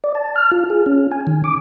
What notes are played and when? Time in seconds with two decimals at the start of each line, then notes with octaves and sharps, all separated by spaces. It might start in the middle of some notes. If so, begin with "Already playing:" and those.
0.04 D5
0.15 A5
0.36 F6
0.52 F4
0.70 G#4
0.86 C#4
1.12 G#5
1.27 D#3
1.44 D6